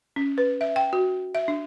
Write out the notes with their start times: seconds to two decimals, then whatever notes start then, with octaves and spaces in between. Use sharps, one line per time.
0.16 C#4
0.38 B4
0.61 E5
0.76 G5
0.93 F#4
1.35 E5
1.48 D4